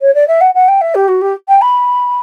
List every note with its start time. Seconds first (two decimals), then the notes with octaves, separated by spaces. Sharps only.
0.01 C#5
0.15 D5
0.28 E5
0.41 F#5
0.55 F#5
0.68 G5
0.81 E5
0.95 G4
1.08 F#4
1.22 G4
1.49 G5
1.62 B5